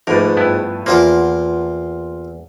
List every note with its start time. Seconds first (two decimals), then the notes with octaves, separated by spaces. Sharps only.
0.07 G#2 F3 G3 A3 A#3 A#4 B4
0.37 G2 B3 E4
0.86 E2 A#3 C4 F4 A#4